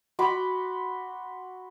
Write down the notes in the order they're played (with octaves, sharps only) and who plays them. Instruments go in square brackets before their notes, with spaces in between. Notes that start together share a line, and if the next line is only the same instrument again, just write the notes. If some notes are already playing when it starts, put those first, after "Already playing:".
[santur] F#4 B5 C6 D6